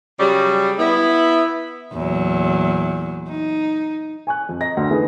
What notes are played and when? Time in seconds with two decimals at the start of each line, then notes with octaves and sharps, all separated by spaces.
0.20 C#3 F#3 G3
0.79 B3 E4
1.93 E2 A#2 F#3
3.29 D#4
4.27 G#5 C#6 F#6
4.49 F2
4.61 D#5 A#5 A#6
4.77 D2
4.91 E3 A3 B3 D#4 G#4